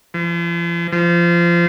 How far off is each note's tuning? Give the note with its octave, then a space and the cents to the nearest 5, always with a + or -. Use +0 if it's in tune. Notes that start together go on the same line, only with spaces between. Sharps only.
F3 -45
F3 -25